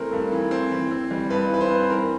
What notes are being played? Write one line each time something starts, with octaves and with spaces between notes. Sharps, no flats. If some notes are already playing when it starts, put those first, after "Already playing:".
Already playing: E3 A3 C4 A#4
G2
E3
C4
E3
C4
G3
G2 B4
E3 B4
C5
C4
E3 A#4